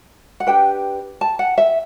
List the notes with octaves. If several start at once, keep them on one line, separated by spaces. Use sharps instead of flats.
F#5
D4 G4 B4 G5
A5
F#5
E5